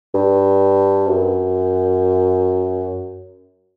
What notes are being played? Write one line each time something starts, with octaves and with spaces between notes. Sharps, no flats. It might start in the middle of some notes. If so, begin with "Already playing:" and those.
G2
F#2